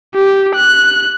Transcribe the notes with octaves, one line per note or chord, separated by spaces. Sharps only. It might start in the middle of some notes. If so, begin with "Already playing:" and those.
G4
F#6